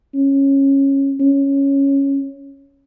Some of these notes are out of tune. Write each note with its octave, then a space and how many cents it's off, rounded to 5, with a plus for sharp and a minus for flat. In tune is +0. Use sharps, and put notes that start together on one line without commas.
C#4 -15
C#4 -5